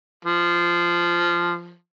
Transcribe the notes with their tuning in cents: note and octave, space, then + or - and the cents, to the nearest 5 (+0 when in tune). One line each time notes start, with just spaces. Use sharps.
F3 -10